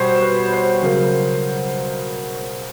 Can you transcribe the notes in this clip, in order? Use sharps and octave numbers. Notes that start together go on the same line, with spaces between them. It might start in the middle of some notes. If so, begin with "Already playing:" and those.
Already playing: B2 G3 C5 C#5
B4
C5
C#3 F#3 A#3